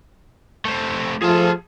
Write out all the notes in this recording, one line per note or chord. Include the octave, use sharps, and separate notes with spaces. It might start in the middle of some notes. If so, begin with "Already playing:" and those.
A3 C4
F3 A3 F4 G#4 A5